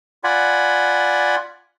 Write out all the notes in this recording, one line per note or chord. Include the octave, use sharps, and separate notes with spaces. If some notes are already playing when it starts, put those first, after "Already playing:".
F4 D5 F#5 G#5 B5